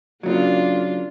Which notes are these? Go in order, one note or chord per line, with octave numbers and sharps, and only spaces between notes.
C#3 F#3 A#3 D4 F4